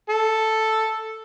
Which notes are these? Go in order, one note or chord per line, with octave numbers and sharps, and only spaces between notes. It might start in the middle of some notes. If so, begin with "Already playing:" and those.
A4